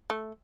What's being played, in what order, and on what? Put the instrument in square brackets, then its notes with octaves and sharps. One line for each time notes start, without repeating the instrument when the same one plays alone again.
[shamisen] A3